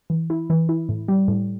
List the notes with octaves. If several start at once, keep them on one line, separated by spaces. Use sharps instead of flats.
E3
E4
E3
E4
A2
G3
A2